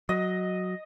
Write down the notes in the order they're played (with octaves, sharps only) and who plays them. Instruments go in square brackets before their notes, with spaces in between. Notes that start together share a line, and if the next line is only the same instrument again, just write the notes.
[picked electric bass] F#3 [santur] D#5